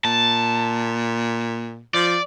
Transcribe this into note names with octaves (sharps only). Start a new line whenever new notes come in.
A#2 A5
F3 D5